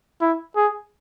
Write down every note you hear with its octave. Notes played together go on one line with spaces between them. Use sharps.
E4
G#4